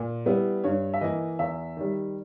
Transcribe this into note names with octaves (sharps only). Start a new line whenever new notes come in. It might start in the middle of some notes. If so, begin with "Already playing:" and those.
Already playing: A#2
G3 B3 E4
G2 C#5
E5
E3 A#3 E4 D#5
E2 E5
D#3 G3